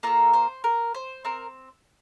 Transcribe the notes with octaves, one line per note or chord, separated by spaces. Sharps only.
A#3 F4 A4 A#5
C5
A#4
C5
C4 A#4